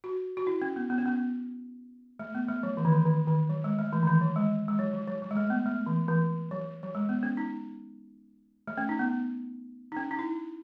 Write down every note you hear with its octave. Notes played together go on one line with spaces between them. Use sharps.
F#4
F#4
E4
C#4
B3
B3
C#4
B3
A3
B3
A3
F#3
E3
D#3
E3
D#3
D#3
F#3
G#3
A3
E3
D#3
E3
F#3
G#3
G#3
F#3
F#3
F#3
F#3
G#3
A3
B3
A3
E3
E3
F#3
F#3
G#3
B3
C#4
D#4
A3
C#4
D#4
B3
D#4
C#4
D#4
E4